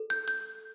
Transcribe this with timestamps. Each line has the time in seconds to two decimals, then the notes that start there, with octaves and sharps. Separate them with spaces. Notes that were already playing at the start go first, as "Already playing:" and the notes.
Already playing: A4
0.10 G6
0.28 G6